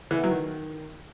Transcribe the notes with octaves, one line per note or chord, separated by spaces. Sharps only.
E3
B3
F#3
D#3